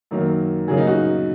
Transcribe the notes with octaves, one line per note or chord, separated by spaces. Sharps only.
F#2 D#3 F#3 A#3
F#2 C#3 F#3 A#3 G#4
D#4
F#4